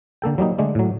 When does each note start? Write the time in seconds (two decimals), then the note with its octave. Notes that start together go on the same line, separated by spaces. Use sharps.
0.22 D3 A#3 A4 G5
0.38 F#3 G3 A#3 D#4
0.58 D3 G#3 A3 D4
0.75 A2 F#3